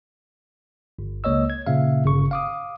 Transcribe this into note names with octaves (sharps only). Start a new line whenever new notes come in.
G1
C#2 A#3 C#5 D#5 E6
G#6
A#2 C#3 E5 F5
G1 C#3 C#6
F5 D6 D#6